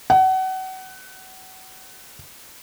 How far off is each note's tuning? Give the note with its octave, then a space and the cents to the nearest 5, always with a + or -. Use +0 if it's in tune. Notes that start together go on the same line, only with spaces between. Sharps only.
F#5 +30